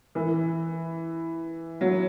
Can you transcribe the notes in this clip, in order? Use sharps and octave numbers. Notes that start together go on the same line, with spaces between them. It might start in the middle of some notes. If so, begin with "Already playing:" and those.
E3
F#3